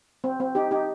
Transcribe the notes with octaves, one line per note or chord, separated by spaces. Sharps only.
C4
C4
D#4 G4
D#4 G4